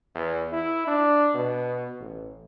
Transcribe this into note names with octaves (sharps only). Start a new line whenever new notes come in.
E2
E4
D4
B2
A1